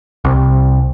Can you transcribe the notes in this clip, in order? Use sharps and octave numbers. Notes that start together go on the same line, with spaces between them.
C2